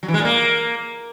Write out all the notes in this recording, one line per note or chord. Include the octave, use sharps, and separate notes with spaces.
F#3
E3
G#3
A#2
A#3